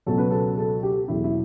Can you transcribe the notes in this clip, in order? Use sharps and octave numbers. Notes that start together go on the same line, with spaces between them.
C#2 B2 F#3 A4
B4
A4
A4
G4
E2 B2 F#3 E4
E4